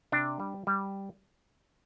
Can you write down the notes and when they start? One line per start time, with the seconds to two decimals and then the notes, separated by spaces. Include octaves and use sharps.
0.12 C3 D4
0.40 G3
0.67 G3